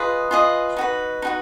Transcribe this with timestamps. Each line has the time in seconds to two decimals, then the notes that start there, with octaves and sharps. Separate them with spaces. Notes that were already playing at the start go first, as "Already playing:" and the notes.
Already playing: F4 G#4 B4 D#5
0.31 F4 G#4 B4 D#5
0.77 D#4 F#4 B4
1.22 D#4 F#4 B4